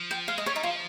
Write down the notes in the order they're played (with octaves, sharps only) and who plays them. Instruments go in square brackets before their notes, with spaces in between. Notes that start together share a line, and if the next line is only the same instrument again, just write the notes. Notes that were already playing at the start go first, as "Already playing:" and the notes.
Already playing: [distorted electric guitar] F3
[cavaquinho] G5
[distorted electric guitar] G#3 [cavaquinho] F5
[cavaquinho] D#5
[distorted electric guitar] G3 [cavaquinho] C#5
[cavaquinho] D#4
[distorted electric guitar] F3 [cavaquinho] F4